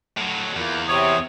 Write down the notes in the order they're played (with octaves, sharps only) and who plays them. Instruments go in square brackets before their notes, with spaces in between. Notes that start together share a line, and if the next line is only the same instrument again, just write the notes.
[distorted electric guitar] A2 F#3
[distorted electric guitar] E2 [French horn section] A#3 E4 F4
[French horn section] C3 [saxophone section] C#5 [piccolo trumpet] D#6